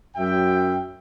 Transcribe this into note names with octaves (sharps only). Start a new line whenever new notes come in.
F#2 F#3 E5 G5